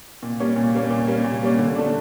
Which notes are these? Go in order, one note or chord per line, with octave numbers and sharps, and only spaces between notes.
A#2
G3 A#3 C#4
A#2
G3 A#3 C#4
A#2
G3 A#3 C#4
A#2
G3 A#3 C#4
D3
A3 D4